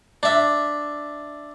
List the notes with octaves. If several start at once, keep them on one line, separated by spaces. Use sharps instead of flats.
D4 E5